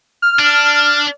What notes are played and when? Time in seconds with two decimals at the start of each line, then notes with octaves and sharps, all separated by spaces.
0.22 F6
0.39 D4